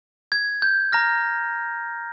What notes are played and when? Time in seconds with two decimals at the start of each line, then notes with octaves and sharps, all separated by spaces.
0.32 G#6
0.62 G6
0.92 A#5 F6 A#6